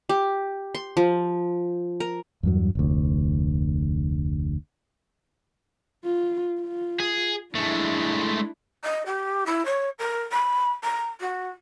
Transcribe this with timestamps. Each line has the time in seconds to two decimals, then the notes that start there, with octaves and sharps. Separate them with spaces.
0.09 G4
0.75 C6
0.97 F3
2.00 A#4
2.43 E2 G2 F#3
2.75 F1 D2
6.05 F4
6.61 F4
7.00 G#4
7.55 G#3 A3 D4 E4
8.84 D#5
9.06 G4
9.46 E4
9.65 C#5
9.99 A#4
10.32 B5
10.84 A#5
11.21 F#4